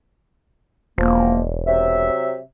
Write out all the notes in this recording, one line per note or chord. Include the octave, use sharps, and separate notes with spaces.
E1 F3 A#3
C3 F#3 E5